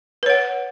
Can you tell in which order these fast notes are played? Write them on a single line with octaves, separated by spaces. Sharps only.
B4 C#5 F#5